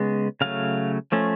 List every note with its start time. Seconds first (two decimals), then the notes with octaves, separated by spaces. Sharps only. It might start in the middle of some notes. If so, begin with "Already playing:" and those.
Already playing: C#3 G#3 B3
0.41 C#3 F#3 A3 F5
1.12 F3 A3 C#4